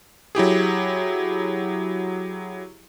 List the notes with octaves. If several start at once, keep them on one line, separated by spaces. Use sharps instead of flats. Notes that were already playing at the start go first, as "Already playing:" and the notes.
F#3 E4 G4 G#4